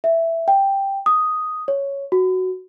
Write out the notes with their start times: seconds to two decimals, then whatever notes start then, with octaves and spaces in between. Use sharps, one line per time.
0.04 E5
0.48 G5
1.06 D#6
1.68 C#5
2.12 F#4